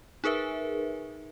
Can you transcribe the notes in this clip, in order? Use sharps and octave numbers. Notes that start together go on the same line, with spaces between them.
D#4 G#4 A#4 B4 E5